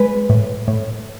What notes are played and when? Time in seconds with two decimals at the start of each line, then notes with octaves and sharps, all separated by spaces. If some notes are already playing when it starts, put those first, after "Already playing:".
Already playing: G#3 B4
0.29 A2
0.68 A2